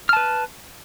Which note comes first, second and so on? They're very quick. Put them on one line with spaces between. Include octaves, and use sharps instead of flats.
F6 A5 B4